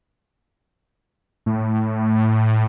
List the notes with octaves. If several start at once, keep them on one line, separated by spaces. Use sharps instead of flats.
A2